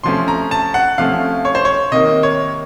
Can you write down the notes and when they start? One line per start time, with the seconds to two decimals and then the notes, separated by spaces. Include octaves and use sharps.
0.04 C3 F3 A3 C#4 C6
0.28 A#5
0.51 A5
0.74 F#5
0.98 C3 F3 A3 C#4 F5
1.45 C#5
1.55 C5
1.65 C#5
1.92 C3 D#3 A#3 D#5
2.23 C#5